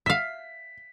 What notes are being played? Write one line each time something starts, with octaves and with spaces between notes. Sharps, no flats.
E5 F5 B6